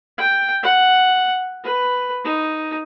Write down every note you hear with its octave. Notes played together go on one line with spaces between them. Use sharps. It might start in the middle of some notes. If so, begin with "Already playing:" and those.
G5
F#5
B4
D#4